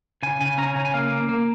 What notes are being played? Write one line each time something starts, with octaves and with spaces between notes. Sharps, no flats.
C#3 G#5
C#3 G#5
C#4 A#5
G#5
C#3 A#5
G#5
A#3 F5
A#3
A#3